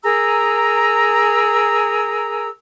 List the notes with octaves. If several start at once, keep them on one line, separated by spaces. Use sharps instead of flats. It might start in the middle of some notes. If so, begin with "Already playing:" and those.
G#4 A#4 A#5 E6